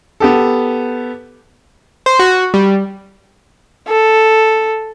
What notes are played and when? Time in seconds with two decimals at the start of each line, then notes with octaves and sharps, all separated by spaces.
0.20 B3 G4 A4
2.06 C5
2.19 F#4
2.54 G3
3.88 A4